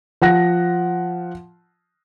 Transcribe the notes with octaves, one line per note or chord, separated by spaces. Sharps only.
F3 F#5 A#6